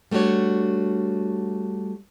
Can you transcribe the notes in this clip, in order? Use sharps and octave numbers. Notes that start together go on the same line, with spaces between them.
G3 A3 D4 F#4 C#5